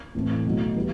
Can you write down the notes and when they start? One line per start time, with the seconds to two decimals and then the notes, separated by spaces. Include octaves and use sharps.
0.15 A2 E3 A3 C4
0.46 B2 F#3 A3 D#4
0.76 E3 G3 B3 E4